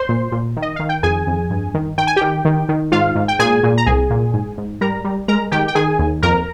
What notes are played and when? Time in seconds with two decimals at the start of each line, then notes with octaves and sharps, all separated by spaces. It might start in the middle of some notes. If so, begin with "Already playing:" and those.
Already playing: C5 C6
0.09 A#2
0.32 A#2
0.56 D#3
0.62 D#5
0.76 D#3 F5
0.89 G5
1.03 F2 G#4 G#5
1.27 F2
1.50 G2
1.74 D#3
1.98 D#3 G5
2.07 G#5
2.16 D#3 G4 G5
2.45 D#3
2.69 D#3
2.92 G#2 F4 F5
3.15 G#2
3.28 G5
3.39 A#2 G#4 G#5
3.63 A#2
3.78 A#5
3.86 C2 G#4 G#5
4.10 A#2
4.34 G#2
4.58 G#2
4.81 G3 A#4 A#5
5.04 G3
5.28 G#3 A#4 A#5
5.51 D#3 G4 G5
5.68 G5
5.75 D#3 G#4 G#5
5.99 D#2
6.22 F2 A#4 A#5